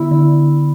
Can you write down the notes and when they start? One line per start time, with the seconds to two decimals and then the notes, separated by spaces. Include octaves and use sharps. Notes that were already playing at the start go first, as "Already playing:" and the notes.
Already playing: D3 B3 E4 B5
0.11 D3